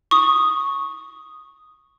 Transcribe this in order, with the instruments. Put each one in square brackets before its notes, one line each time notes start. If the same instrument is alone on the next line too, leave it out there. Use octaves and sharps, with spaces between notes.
[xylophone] C#6 D#6